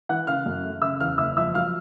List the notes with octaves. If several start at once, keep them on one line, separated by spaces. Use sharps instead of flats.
E3 F#5 F#6
C#3 F5 F6
F#2
A3
C#3 E5 E6
E2 F5 F6
F#1 E5 E6
F3 E5 E6
F#3 F5 F6